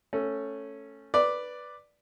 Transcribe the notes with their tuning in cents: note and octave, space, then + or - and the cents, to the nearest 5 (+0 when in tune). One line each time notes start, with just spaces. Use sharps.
A3 +5 C#4 -5
B4 +0 D5 +0